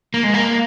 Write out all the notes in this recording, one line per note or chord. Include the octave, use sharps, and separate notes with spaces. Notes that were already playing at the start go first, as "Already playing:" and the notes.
A#3
G#3
A#3